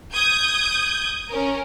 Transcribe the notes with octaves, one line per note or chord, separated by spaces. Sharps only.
D#6 G6 G#6
C#4 A#4